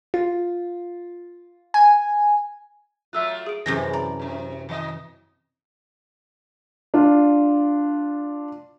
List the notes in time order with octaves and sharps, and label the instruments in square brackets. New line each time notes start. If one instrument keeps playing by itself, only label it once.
[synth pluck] F4
G#5
[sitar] F#3 A3 F4 [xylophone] E5 E6 F#6
[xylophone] G#4 D7
[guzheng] F#2 C3 E3 [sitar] A2 G#3 [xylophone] A#6
[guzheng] D5 [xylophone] A#5
[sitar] F#2 C3
D#3 D#5
[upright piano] D4 F4